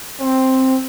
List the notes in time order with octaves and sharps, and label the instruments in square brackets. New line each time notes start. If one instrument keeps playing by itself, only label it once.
[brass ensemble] C4